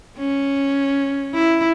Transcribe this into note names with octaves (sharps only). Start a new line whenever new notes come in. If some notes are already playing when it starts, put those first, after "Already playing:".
C#4
E4